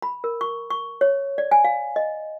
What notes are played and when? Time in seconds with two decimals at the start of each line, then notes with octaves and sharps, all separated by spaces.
0.02 B5
0.24 A#4
0.41 C#6
0.70 C#6
1.01 C#5
1.38 D5
1.51 G#5
1.64 F5
1.96 D#5